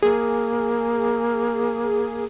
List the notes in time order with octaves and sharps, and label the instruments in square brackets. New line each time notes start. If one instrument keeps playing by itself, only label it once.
[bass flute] A#3 [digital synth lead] G#4